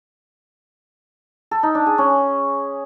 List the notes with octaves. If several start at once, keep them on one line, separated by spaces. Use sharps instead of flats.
A4
D#4
D4
G#4
C#4